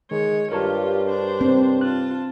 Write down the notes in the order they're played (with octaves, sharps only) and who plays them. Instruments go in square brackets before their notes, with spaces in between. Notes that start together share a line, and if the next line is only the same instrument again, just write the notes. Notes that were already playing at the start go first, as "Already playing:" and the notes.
[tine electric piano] D#3 [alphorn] G#3 [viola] C#5
[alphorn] G2 [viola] F4 G4 [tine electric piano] A#4 C#5 A5
[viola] D4 C5
[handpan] C4
[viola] F4 A5 [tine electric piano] F#6